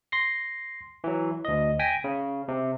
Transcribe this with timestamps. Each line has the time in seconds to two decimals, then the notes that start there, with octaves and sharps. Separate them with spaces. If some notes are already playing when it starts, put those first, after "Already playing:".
0.12 C6 A#6 C7
1.04 E3 F#3
1.45 D2 D#5
1.79 G5 G#5 A#6 B6
2.04 C#3
2.48 C3